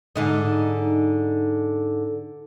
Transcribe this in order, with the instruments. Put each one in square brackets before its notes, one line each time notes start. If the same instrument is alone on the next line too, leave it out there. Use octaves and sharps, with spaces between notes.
[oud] G#2 D3 D#4